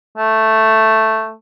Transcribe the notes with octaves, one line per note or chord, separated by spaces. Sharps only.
A3